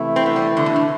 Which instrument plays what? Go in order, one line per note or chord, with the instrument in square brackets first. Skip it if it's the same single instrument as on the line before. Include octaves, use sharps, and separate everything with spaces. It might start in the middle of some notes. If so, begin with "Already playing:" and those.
Already playing: [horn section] C3 E3 A3 E4
[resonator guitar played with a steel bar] C4
B3
G3
D3
B2
A2